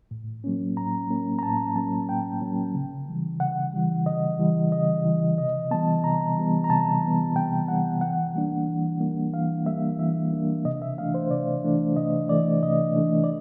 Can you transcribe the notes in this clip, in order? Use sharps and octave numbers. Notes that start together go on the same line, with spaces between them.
A2
F#3 A#3 C#4
A2 A#5
F#3 A#3 C#4
A#5
A2 A5
F#3 A#3 C#4 A5
A2 G5
F#3 A#3 C#4
C#3
E3 G3
C#3 F#5
E3 G3
C#3 D#5
E3 G3
C#3 D#5
E3 G3
C3 D#5
E3 G3 B3 A5
C3 A#5
E3 G3 B3
A#5
C3 A5
E3 G3 B3
C3 G5
E3 G3 B3 F#5
E3 F#5
G3 A#3 D4
E3
G3 A#3 D4
E3 F5
G3 A#3 D4 E5
E3 E5
G3 A#3 D4
C3 D#5
E5
E3 A3 D4 F5
C5
C3 D5
E3 A3 D4
C3 D#5
E3 A3 D4 D5
C3 D#5
E3 A3 D4
D5